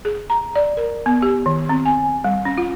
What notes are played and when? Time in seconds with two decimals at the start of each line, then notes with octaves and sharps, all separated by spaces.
0.05 G#4
0.30 A#5
0.56 D5
0.77 A#4
1.06 B3
1.22 G4
1.46 D#3
1.69 C4
1.86 G#5
2.24 G3
2.45 C#4
2.57 F4